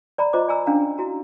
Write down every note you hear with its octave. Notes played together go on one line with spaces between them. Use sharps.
D5 A#5 B5
F4 C5 D#5 A#5 D6
D5 G#5 A#5 E6
C#4 D4 F5 A#5
E4 F#4 A#5